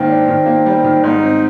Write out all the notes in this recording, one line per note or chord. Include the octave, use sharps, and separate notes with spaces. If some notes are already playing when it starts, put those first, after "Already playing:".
Already playing: G#2 D#3 A#3 C4
D4
D#3
A#3
G3
D#3
G#2 D#4
C4